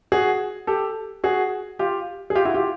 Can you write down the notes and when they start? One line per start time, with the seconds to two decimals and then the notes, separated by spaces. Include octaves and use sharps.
0.12 F#4 G#4
0.67 G4 A4
1.24 F#4 G#4
1.79 F4 G4
2.30 G#4
2.35 F4 G4
2.45 E4 F#4
2.54 F4 G4